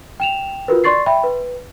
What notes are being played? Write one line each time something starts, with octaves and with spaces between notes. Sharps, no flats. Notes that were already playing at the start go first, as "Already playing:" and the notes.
G5 E7 F7
F4 F#4 A#4 B4
D5 C6 C#6 A6 C7
E5 G5 B5
B4